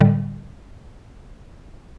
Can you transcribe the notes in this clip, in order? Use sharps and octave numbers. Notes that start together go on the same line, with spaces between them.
A2 D3 G3